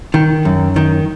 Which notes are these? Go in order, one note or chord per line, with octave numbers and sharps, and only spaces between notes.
D#3
F#2
D#3